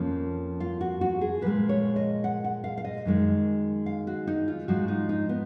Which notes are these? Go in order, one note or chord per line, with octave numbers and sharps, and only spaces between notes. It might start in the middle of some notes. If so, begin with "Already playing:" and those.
Already playing: F2 F3 A#3 C#4
F4
F#4
F#4
G#4
A#2 F3 G#3 B4
C#5
D#5
F#5
F#5
F5
F5
D#5
F#2 D#3 G#3
F5
F#4
D#4
F4
G#2 F3 G#3 F#4
D#4
D#4
B3